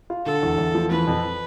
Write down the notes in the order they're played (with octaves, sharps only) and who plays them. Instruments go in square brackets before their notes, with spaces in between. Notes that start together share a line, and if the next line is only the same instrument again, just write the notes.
[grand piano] F4
[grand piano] D3 [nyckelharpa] A4
[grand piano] E2
E2
F3
[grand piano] E3 [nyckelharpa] B4
[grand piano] F2